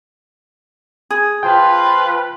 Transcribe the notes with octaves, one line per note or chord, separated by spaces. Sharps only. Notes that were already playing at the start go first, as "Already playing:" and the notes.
G#4
F3 F4 B4 G5